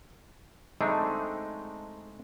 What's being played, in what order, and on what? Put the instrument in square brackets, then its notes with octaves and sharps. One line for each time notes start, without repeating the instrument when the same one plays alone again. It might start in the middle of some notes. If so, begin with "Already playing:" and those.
[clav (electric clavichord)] G#3 A3 C4 D4 D#4